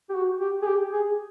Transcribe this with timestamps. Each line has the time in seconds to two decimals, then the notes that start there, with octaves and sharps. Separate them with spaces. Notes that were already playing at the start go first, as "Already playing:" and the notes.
0.10 G4
0.15 F#4
0.40 G4
0.62 G#4
0.66 G4
0.92 G#4